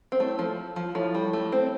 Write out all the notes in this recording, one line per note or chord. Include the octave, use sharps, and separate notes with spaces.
C4
A2 A3
F3
F3
A2 F3
G3
A3
C4